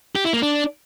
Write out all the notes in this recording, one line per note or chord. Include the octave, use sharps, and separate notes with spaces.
G4
E4
A#3
D4